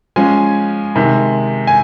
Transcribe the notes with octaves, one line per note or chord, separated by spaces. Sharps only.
F3 G#3 C#4 G#5
C3 D#3 G#3
G#5